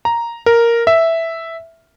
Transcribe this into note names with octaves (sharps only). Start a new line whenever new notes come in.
A#5
A#4
E5